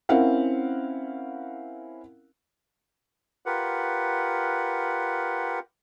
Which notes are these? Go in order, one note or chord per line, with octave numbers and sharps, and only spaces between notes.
C4 C#4 E4 A#4 F5 F#5
F4 G4 A#4 B4 F#5